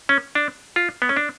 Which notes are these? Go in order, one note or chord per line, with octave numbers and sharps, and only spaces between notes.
C#4
D4
F4
B3
C#4
D4